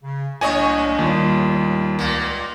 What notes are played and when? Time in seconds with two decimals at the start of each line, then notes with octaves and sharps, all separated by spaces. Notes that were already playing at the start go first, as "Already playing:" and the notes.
0.03 C#3
0.41 C2 A2 A#3 D4 C#5 D#5 G#5 C#6
0.99 D#2 G3 F4
1.99 C#2 A#2 A#3